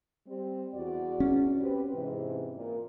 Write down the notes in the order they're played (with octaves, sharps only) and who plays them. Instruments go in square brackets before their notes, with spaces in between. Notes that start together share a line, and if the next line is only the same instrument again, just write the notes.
[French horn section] G3 C4
E2 F#4 D5
[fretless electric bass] C#4
[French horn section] C4 G4 B4
G#2 C3 E3
A#2